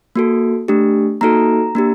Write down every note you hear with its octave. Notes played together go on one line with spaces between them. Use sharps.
A#3 F#4 A4
A3 D4 G4
A#3 D#4 F#4 A4 A#5
A#3 D4 G4